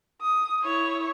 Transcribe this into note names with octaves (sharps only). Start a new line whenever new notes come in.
D#6
E4 C#5